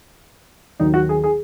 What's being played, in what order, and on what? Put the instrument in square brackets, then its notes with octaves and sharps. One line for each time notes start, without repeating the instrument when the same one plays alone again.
[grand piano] D#2 D#3 F#3 D#4
F#4
G#4
G#4